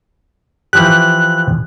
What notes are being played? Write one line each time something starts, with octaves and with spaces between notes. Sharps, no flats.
E3 F3 G4 F#6